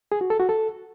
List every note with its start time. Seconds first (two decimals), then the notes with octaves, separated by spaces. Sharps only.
0.12 G#4
0.21 F#4
0.30 A4
0.40 F#4
0.49 A4